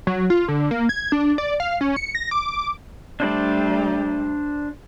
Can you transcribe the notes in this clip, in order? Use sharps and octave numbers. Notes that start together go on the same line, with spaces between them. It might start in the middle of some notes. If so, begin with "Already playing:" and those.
F#3
F4
D3
A#3
G#6
D4
D5
F5
C#4
C#7
A#6
D6
G3 A3 D4 C5 D5